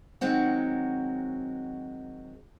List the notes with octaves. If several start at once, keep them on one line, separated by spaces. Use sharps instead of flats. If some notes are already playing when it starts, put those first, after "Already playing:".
D#3 F#3 G#3 C4 F#4